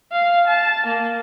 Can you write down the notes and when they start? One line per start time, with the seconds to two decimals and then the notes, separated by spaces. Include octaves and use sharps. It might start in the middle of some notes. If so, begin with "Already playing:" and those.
0.12 F5
0.47 A5
0.87 A#3